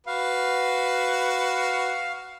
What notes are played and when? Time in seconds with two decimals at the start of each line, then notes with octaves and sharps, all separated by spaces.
0.07 F#4 B4 F5